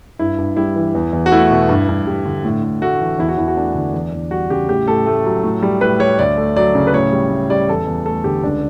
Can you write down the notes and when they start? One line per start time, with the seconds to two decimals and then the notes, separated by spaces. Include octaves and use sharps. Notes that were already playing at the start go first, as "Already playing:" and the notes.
0.19 G2 E4
0.38 G2
0.56 G3 E4
0.76 E3
0.95 E2
1.13 E2
1.26 F#4
1.32 A3 E4
1.50 B2
1.69 G2
1.89 G2
2.07 G3
2.25 D3
2.45 A2
2.63 A2
2.82 A3 F#4
3.00 E3
3.19 E2 E4
3.29 F#4
3.37 E2 E4
3.48 F#4
3.56 A3 D4
3.75 D3
3.94 E2
4.13 E2
4.31 G3 F#4
4.50 C#3 G4
4.69 A2 G4
4.88 A2 A4
5.06 A3
5.24 F#3
5.44 A2
5.62 G3
5.81 A2 B4
6.00 G3 C#5
6.19 D2 D5
6.37 A3
6.56 F#3 D5
6.75 C#3
6.87 B4
6.93 A2 C#5
7.12 G3
7.31 A2
7.50 G3 D5
7.69 E2 A4
7.87 E2
8.06 A3 A4
8.24 D3 G4
8.43 C#2 D4